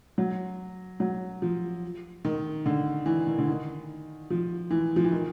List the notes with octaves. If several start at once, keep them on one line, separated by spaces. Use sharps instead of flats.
F#3
F#3
F3
D#3
D3
E3
D#3
D3
D#3
F3
E3
F3
E3
D#3